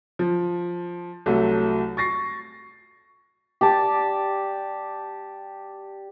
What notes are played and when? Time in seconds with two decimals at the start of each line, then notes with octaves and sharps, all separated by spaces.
0.19 F3
1.26 C2 F#3 A3
1.97 C#6 A6 A#6 C7
3.61 G4 D5 A5